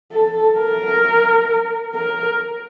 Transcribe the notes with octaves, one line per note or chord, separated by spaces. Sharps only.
A4
A#4
A#4